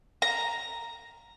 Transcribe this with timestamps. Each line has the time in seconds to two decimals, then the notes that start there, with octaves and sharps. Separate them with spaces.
0.22 A#5